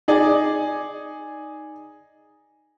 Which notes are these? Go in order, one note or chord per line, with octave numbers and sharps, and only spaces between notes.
D#4 G#4 D5